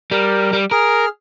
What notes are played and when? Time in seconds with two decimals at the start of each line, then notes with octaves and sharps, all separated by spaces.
0.11 G3 A#4
0.53 G3
0.71 G#4 A#4 F6